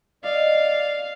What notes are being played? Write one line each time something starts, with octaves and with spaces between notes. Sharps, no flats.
D5 D#5 F5